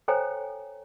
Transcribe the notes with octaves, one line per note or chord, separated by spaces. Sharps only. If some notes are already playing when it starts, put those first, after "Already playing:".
A4 C5 C#5 G5 G#5 A#5